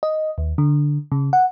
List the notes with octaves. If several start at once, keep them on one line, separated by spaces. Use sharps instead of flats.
D#5
D#2
D3
C#3
F#5